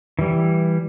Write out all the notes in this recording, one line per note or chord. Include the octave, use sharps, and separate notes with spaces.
E3 G3